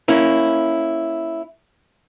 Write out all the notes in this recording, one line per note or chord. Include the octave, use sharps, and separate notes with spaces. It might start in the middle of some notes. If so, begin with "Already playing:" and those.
A#3 C#4 E4